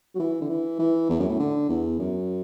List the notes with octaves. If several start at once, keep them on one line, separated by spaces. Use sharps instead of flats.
F#3
E3
D3
E3
E3
E2
F#2
A2
D3
E2
F#2